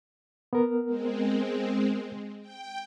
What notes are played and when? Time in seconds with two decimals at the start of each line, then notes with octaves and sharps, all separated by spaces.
0.53 B3 A#4
0.87 G#3 C4
2.41 G5